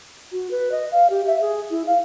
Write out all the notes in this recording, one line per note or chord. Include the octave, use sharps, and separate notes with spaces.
F#4
B4
D#5
F5
G4
E5
G#4
E4
F5